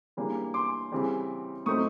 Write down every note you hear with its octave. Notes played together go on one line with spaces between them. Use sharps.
C#3 E3 G3 A#3 D4
C6 D6
C#3 E3 G3 C4
A2 F#3 A3 C4 D#4 C#6 D#6